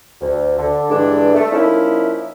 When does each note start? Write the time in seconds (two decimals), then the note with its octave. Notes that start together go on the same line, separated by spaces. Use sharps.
0.21 D2
0.58 D3
0.90 G2 D3 E3 G#3 D4
1.34 A3
1.52 F3 A#3 C#4 D#4 E4